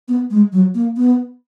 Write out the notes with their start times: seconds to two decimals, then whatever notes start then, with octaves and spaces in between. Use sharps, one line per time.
0.08 B3
0.31 G#3
0.52 F#3
0.75 A#3
0.97 B3